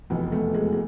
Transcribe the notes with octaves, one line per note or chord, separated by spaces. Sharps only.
F1 E2 B2 B3
A3
G#3
G#3